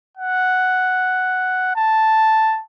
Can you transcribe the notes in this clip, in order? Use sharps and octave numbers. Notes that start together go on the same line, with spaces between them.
F#5
A5